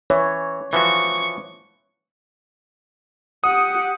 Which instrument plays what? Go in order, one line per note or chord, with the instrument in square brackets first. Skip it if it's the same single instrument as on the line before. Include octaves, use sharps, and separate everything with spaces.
[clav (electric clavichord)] E3 [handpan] C#5
[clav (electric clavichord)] E3 F3 F#4 [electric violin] C#6
[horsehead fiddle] G4 F#5 [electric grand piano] D#6